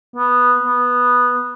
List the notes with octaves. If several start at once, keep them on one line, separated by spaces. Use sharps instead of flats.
B3
B3